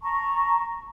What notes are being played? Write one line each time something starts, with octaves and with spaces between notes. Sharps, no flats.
A5 A#5 C#6